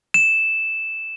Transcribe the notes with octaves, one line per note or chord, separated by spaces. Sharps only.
E7